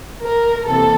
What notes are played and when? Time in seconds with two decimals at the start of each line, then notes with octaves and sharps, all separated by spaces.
0.23 A#4
0.65 C3 E3 A#3 A4